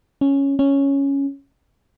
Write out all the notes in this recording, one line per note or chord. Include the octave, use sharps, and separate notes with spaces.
C#4
C#4